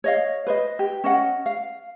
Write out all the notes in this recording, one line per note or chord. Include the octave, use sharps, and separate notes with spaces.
C#5 D#5 F5
B4 C5 D#5
G4
C#4 D#5 F#5
F5